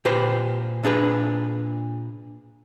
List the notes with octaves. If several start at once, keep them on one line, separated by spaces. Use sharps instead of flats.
A#2 G4 B4 C5
A#2 D4 G#4 B4